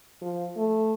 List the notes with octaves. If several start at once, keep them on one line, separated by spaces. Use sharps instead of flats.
F3
A3